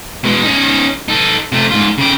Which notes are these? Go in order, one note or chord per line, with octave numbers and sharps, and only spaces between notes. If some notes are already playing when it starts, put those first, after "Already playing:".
B2 G#3
C#4 D#4
D#4 A4
C3 A3
G#2 F4
C#3 G4